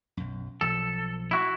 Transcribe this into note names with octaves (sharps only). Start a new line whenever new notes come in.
B1 F#2
B1 F3 A4
E4 F#4